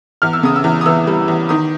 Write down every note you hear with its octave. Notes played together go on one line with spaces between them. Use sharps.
E2 F6
E6
C#3 D#6
E6
E2
D#6
E3 E6
G3
E2
D#3 D#6